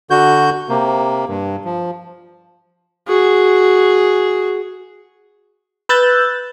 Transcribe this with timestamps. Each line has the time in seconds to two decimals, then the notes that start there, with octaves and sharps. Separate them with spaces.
0.10 D3 F#4 G6
0.69 C3 A#3
1.28 G2
1.65 F3
3.07 F#4 G#4
5.89 B4 E6 F#6 G6 A6